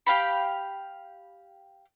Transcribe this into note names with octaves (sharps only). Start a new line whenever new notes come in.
G4 F5 G5 B5